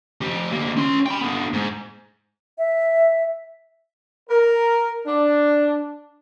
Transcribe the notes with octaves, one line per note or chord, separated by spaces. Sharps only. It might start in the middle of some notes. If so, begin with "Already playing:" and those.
F3 G4
D3 A#3
C#4 C6
G5 B5
D3 B3
G#2
E5
A#4
D4